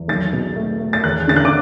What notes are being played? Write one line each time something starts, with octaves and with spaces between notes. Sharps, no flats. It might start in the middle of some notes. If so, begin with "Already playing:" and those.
Already playing: E2 E3
B1 A6
B2
A3
A3
A6
E2 F#6
D3 A6
F#6
D6